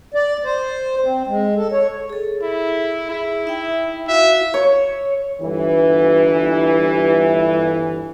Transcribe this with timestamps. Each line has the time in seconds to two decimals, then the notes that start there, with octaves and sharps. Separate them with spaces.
0.14 D5
0.44 C5
1.02 C4
1.27 G#3
1.56 A4
1.72 C#5
2.10 G#4 A4
2.42 E4
3.10 E4 G#4 E5
3.45 D#4 E5 G5
4.07 E4 F#4 E5 F5
4.54 C#5
5.41 G1 E3